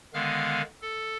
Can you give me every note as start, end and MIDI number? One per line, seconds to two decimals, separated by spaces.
0.14 0.62 50
0.14 0.62 51
0.14 0.62 56
0.14 0.62 59
0.14 0.62 77
0.14 0.62 89
0.81 1.17 69